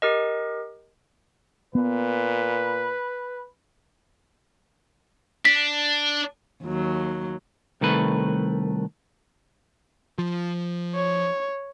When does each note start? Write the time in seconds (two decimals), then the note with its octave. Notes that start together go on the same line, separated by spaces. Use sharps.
0.02 G4 A#4 D#5
1.75 A#2 B3 B4
5.45 D4 B6
6.63 D#2 F#3
7.81 C2 D#3 A3 B4
10.18 F3
10.95 C#5